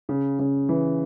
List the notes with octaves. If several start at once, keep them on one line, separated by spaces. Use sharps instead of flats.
C#3
C#3
E3